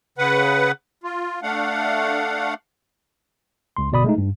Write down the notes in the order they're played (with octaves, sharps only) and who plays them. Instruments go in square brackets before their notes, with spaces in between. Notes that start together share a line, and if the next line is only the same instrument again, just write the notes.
[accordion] C#3 B4 F#5
F4
A3 D4 F5 F#5
[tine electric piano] C#2 C6
G1 B2 D5 B5 D#6
G#3 A3 D#4
G2